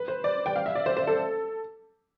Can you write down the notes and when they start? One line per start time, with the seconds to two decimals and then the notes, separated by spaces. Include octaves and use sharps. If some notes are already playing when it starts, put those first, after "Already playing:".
Already playing: B4
0.08 C5
0.24 D5
0.46 G5
0.56 F5
0.66 E5
0.75 D5
0.86 C5
0.97 C5
1.07 A4